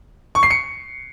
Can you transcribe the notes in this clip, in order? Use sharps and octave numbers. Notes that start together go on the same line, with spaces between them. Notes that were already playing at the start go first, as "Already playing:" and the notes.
C#6
C7
C#7